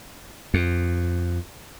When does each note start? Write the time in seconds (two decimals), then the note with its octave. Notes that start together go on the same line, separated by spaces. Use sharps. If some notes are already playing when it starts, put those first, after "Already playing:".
0.54 F2